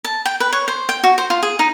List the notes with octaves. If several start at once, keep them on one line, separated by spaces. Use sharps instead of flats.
A5
G5
B4
C#5
C5
G5
F#4
C5
F4
G#4
D#4